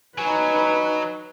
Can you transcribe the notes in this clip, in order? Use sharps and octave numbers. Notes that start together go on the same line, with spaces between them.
F#3 D#4 B4 G#5